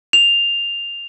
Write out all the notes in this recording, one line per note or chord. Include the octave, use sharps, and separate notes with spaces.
F7